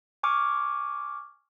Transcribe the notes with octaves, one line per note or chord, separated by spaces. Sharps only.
G#5 C#6 D6 F6